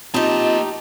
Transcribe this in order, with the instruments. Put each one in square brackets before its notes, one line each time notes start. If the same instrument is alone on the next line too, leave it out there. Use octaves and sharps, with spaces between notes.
[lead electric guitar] A#3 A5 [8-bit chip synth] C4 F4 [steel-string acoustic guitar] D#4 G4 [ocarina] D#5